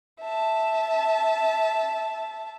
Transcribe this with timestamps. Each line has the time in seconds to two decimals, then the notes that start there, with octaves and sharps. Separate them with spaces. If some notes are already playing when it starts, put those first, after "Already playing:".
0.21 E5 A5